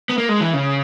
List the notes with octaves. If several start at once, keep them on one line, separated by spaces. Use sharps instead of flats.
B3
A#3
G#3
E3
C#3